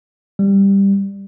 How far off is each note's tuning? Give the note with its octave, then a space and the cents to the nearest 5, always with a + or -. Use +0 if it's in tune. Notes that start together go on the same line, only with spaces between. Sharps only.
G3 +10